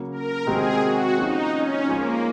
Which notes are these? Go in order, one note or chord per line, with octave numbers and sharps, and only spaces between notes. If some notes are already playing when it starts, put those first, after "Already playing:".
Already playing: C#3 F#3 A#3
A#4
C3 D#3 G#3 C4 F#4 G#4
F#4
F3 A#3 C#4 D#4 F4
C#4
F3 G#3 A#3 C#4 F4